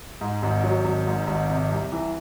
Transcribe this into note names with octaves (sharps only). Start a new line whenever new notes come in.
G#2
G#1
F#3
G#1
G#2
G#1
C3
C2
E3